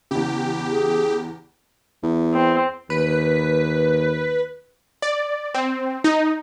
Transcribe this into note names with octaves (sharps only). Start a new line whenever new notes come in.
E2 C#3 G4
G#4
E2
C4
D#2 B4
D5
C4
D#4